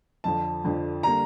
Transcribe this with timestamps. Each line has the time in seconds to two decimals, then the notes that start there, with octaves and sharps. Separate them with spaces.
0.24 F2 D3 F3 A5
0.65 F2 D3 F3
1.03 D3 G3 A#3 A#5